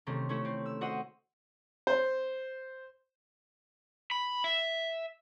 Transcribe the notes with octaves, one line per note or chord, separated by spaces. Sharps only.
C3 D#3 A3 C4 C#4
A3 C#4 E4
C4
E6
F#4 C5 D#5 F#5 E6
C5
B5
E5